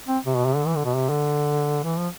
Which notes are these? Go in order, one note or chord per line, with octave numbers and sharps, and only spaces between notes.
C4
C3
B2
C3
D3
E3
D3
B2
C3
D3
E3
F3